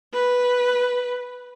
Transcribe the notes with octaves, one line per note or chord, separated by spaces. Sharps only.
B4